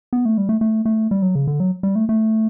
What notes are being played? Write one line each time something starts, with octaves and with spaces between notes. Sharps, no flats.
B3
A3
G3
A3
A3
A3
G3
F#3
C#3
D3
F#3
G3
A3
A3